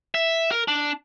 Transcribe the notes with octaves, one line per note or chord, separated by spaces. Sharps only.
E5
A#4
D4